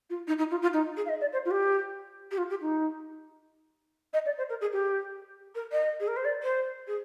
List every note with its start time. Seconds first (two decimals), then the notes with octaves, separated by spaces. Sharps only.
0.10 F4
0.27 D#4
0.38 D#4
0.51 F4
0.62 F4
0.73 D#4
0.97 G#4
1.05 F5
1.09 D#5
1.21 D5
1.32 C5
1.45 F4
1.50 G4
2.31 G4
2.37 F4
2.49 G4
2.61 D#4
4.13 D#5
4.25 D5
4.37 C5
4.49 A#4
4.61 G#4
4.73 G4
5.55 A#4
5.72 D#5
6.00 G#4
6.07 A#4
6.16 C5
6.24 D5
6.42 C5
6.87 G#4